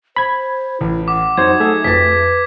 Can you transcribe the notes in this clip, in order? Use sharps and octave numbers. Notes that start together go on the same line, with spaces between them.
C5 B5 G#6
A1 E4
F#5 D6
F2 F#3 D#4 F#4 C5 G#6
A3 G#4 E5
F2 B4 A6 B6